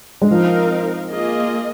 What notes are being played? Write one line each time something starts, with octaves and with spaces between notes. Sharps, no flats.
G#3
F3 C4 D#4 A#4 F5
A#3 F4 G#4 D#5